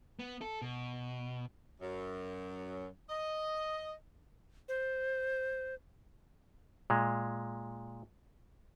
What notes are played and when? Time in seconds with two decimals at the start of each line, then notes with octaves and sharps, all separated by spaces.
0.19 B3
0.41 A4
0.62 B2
1.81 F#2
3.10 D#5
4.68 C5
6.90 A#2 G#3